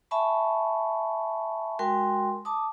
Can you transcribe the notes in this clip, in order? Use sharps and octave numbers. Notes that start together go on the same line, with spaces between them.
E5 G#5 A5 B5 C#6
G#3 F#4 A#4 G5 G#5 C6
A5 D6 D#6